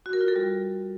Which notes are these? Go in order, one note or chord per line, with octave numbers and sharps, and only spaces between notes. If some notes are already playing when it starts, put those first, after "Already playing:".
F#4
A#4
F4
A4
G3